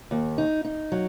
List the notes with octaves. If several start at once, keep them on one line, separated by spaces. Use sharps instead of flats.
D#2
D#4
D#4
F#3